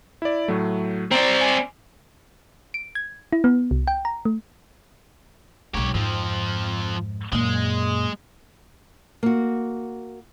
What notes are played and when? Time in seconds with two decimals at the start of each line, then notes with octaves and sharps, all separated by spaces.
0.22 E4 D5
0.48 A2 F#3 A3
1.11 C4 C5 D5 G5 A#5
1.41 G#5
2.74 D7
2.95 G#6
3.33 E4
3.44 B3
3.71 C2
3.87 G5
4.05 A#5
4.25 A3
5.74 B1 G#3 G4 C#5
5.94 F2 G#2 F3 C4
7.32 F#2 A#2 G#3
9.23 A#3 F#4